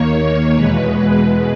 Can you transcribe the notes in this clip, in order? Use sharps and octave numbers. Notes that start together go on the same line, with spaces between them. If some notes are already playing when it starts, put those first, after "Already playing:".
Already playing: D#2 D#3 A#3 C#5
C#5
E2 B2 G#3 B4